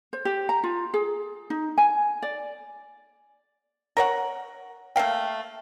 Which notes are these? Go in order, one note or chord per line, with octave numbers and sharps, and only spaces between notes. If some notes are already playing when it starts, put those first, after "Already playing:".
C5
G4
A#5
F4
G#4
D#4
G#5
D5
A#4 C#5 F#5
A3 A#3 F5 G5